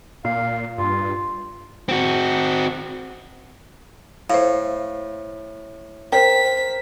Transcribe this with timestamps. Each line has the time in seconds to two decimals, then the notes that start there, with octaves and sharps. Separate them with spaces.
0.25 A#2 F5
0.78 G2 F4
1.89 C4 F#4
4.30 A2 C5 F5
6.12 A#4 C5 G5 B6